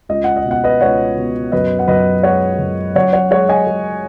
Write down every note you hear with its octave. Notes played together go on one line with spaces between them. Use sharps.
C#2 D#5
F#5
D#5
B2
F#5
B4 D#5
C#2 C#5 F#5
B2
F#2 B4 D#5
F#5
F#2 B4 D#5
G#3 C#5 F#5
F#2
F#2 C#5 F#5
C#5 F#5
G#3 C#5 F#5
D#5 G#5
G#3